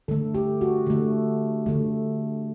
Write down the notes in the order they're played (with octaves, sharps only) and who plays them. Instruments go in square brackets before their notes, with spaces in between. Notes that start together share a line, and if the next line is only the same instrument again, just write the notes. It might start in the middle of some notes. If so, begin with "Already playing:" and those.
[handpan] D3 A3 A4
G4
F#4
D3 A3
D3 A3